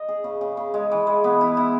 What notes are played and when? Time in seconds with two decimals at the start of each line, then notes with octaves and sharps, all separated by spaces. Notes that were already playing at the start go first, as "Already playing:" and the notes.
Already playing: D#5
0.09 G#4
0.24 C#3
0.41 C#3
0.57 C#3
0.74 G#3
0.91 E3
1.07 G#3
1.24 B3
1.41 E4
1.57 E4